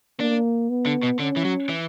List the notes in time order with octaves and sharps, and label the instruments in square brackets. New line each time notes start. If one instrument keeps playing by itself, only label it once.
[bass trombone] A#3 [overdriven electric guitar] D4
[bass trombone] B3
[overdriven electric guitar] D3
B2
[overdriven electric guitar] D3 [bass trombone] C#4
[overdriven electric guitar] E3
F#3
E3